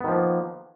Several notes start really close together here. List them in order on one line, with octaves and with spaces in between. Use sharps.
B3 D#3 F3 A#3